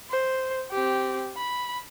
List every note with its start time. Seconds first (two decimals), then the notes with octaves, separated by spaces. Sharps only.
0.11 C5
0.71 C4 G4
1.37 B5